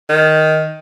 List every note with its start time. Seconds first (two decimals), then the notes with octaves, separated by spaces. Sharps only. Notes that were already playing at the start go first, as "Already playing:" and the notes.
0.09 D#3